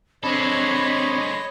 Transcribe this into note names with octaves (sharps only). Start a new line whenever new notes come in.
G#3 C4 D4 A4 C#5 D#5 B5